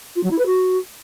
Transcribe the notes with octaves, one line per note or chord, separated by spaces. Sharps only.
F4
F#3
E4
B4
F#4